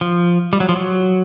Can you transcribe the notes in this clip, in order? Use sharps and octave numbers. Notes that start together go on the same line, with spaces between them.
F3
G3
F#3
F3
F#3